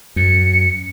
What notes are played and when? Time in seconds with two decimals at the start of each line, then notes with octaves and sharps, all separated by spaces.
0.16 F#2 C#7